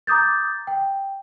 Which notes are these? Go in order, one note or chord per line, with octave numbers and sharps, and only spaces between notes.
A#5 D6 D#6 G6 A6
G5